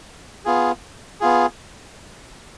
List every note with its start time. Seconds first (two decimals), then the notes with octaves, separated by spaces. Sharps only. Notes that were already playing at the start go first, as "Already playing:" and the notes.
0.45 B3 F4 G#4
1.20 B3 F4 G#4